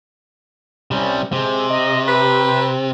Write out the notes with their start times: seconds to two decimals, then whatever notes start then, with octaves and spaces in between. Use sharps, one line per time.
0.91 C3 G3 C#4
1.32 C3 G#3
1.70 D#5
2.08 G4 B4